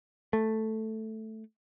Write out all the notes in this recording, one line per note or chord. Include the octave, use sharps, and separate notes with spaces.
A3